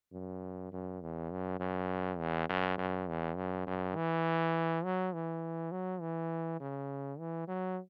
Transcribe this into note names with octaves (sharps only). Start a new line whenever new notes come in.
F#2
F#2
E2
F#2
F#2
E2
F#2
F#2
E2
F#2
F#2
E3
F#3
E3
F#3
E3
C#3
E3
F#3